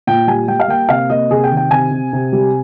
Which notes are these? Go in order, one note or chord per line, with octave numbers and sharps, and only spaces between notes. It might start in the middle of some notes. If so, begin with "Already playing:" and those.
A#2 G5
G3 G#5
G3 G5
F5
A#3 G5
C3 F5
A#3 D#5
C3 G#4
G5
D#3
G5
C3 G#5
C3
C3
G3